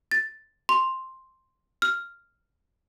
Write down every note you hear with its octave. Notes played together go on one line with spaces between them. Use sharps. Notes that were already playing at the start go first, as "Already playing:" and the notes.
A6
C6
F6